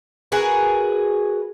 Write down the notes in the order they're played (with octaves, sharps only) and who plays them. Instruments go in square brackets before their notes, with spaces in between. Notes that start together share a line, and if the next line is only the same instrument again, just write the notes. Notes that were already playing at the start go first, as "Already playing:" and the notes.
[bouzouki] F#4 G#4 A#4 B4